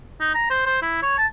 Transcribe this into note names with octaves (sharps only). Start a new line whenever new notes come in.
D#4
A#5
C5
C5
E4
C#5
A5